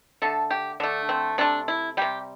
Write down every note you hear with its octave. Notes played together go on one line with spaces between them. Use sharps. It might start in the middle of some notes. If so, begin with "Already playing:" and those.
D3 A3 A4
G4
D3 A3 D4
C4
C3 A3 D4
E4
C3 G3 G4